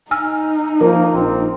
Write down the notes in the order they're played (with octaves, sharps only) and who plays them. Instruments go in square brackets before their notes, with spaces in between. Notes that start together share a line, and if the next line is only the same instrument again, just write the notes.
[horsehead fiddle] D#4 [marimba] G#5 E6 F6
[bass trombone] F3 [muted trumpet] A#3 [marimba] A#4
[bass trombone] A#1 [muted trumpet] C4